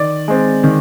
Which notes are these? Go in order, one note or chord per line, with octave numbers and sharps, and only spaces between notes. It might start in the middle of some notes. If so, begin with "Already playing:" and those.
Already playing: D#3 D5
G#3 C4
D#3